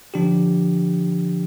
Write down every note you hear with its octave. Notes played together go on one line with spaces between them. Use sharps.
D3 F3 D4 G4